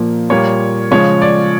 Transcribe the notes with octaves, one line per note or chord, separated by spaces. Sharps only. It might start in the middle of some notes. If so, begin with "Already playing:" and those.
Already playing: A#2 F3 A#3
A#2 G3 A#3 C#5
C#3 F3 G#3 C#5
D5